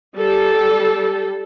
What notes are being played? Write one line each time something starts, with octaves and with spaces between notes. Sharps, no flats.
G3 A4